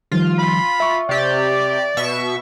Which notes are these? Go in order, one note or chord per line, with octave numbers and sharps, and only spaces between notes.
D#3 F3 G3 F4
B5
E5 C#6
C3 G4 D5
B2 E5 C#6